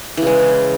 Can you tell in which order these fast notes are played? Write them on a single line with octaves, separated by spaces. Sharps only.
E3 C#3 G#3